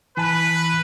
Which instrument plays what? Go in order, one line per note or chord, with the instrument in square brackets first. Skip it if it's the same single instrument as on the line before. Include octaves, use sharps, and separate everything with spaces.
[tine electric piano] E3 G#5 A5 [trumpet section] B4